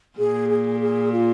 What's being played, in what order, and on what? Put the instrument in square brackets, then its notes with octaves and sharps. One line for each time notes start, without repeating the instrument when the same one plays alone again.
[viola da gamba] A#2 [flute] G#4
[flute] G#4
G#4
F4